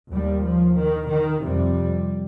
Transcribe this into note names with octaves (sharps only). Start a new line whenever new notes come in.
D#2 G3
F3
D#3
D#3
F2 C3 G3